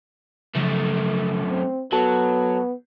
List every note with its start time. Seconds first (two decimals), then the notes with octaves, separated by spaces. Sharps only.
0.55 F#2 C#3 F3 A3
1.48 C4
1.92 F#3 B3 F#4 A4 A5